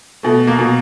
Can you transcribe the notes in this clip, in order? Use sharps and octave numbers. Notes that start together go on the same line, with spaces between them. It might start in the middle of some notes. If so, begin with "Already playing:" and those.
B2 A3
A#3
B2